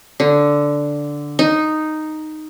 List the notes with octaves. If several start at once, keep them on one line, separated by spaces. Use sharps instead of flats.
D3
D#4